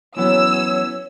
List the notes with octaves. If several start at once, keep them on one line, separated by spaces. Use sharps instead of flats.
E3 F#3 B3 C#4 C#5 E6